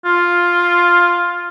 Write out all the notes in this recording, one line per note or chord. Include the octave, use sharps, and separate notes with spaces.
F4